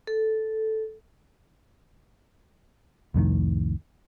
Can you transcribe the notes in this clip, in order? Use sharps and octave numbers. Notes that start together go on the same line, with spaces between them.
A4
C2 F2 A2 D#3